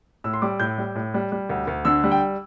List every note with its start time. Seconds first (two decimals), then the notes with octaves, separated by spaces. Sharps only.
0.24 A2 E6
0.33 C6
0.42 G3 D6
0.60 A2 G6
0.78 G3
0.95 A2
1.14 G3
1.32 G3
1.49 D2
1.67 D2
1.85 D3 E6
2.04 G3
2.11 G5